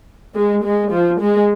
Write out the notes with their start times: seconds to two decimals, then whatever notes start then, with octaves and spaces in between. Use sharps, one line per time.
0.35 G#3
0.64 G#3
0.91 F3
1.21 G#3